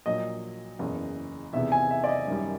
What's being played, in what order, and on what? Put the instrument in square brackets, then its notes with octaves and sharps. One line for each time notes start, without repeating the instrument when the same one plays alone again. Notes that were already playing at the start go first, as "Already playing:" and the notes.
[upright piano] A#1 A#2 F#3 [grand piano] D#5
[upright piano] F#1 E2 C#3
[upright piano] E2 C3 D#3 G#3 B3 [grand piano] E5
[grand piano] G#5
E5
D5
D#5
[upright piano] F#2 D#3 G3